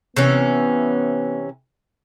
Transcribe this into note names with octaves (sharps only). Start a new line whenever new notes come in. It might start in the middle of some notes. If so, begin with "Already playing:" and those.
C3 E3 B3 C#4